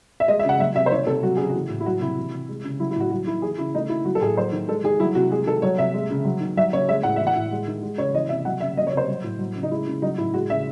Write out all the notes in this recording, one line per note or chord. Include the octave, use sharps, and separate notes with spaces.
E5
G#3 D#5
E5
C#3 F#5
F#3 E5
C3 E5
C5
D#3 C#5
C3 A4
F#3 F#4
C#3 G#4
E3 F#4
A2
E4
F#3 F#4
C3 E4
E3
C3
G#3
C#3
F#3 E4
E4
A2 F#4
F#3 F#4
D#3 E4
E3 G#4
C#3 E4
A3 D#4
D#3 E4
F#3 F#4
A4
A2 G#4
F#3 C5
D#3
G#3 A4
D#3 G#4
F#3 E4
C3 F#4
G#3 G#4
D#3 A4
F#3 C#5
C3 E5
G#3
C#3
F#3
D#3
F#3 E5
C#3 C#5
G#3 E5
A2 F#5
E3 E5
F#5
A2
G#3
D#3
G#3
C#3 C#5
E3 D#5
C3 E5
F#3 F#5
C#3 E5
F#3 D#5
C#5
C3 C5
F#3
A2
F#3
C#3
D#4
G#3 E4
C#3
F#3 D#4
A2 E4
G#3 F#4
C#3 E5